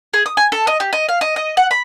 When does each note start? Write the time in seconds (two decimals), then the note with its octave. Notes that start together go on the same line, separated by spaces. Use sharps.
0.14 G#4
0.26 D#6
0.37 G#5
0.52 A4
0.67 D#5
0.80 G4
0.93 D#5
1.09 F5
1.21 D#5
1.36 D#5
1.57 F#5
1.71 B5